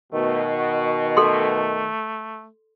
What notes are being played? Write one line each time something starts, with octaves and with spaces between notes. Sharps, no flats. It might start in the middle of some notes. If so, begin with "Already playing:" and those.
B2 D#3 A3
F#4
A3 A4 C6